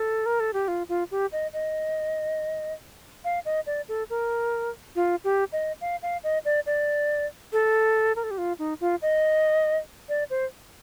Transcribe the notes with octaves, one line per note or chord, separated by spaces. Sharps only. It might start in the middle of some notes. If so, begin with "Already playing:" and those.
Already playing: A4
A#4
A4
G4
F4
F4
G4
D#5
D#5
F5
D#5
D5
A4
A#4
F4
G4
D#5
F5
F5
D#5
D5
D5
A4
A#4
A4
G4
F4
D#4
F4
D#5
D5
C5